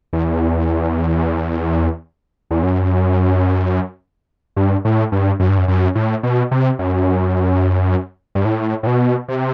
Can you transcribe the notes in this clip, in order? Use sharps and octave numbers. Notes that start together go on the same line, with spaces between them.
E2
E2
F#2
G2
A2
G2
F#2
G2
F#2
F#2
A2
B2
C3
F#2
G2
A2
A2
B2
C3